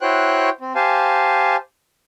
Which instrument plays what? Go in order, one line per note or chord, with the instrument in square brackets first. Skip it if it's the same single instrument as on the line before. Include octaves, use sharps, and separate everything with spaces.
[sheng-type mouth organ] E4 F#4 C5 C#5 G5 F#6
C4
G4 C5 F5 G#5 A5